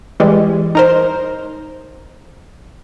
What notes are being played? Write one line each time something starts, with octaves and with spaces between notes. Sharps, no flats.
E3 G3 G#3
D#4 A#4 C5